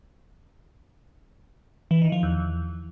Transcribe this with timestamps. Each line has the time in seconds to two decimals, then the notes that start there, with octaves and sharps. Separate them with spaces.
1.91 E3
2.01 D#3
2.12 F3
2.23 E2